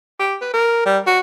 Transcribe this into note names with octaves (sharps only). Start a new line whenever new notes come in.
G4
B4
A#4
G3
F#4